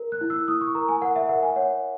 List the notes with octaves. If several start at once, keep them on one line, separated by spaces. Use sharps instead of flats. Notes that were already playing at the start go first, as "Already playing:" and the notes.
Already playing: A#4
F#6
E4
E6
E4 D#6
C#6
A#4 A#5
G#5
A#4 F#5
E5
A#4 F#5
G#5
C#5 F#5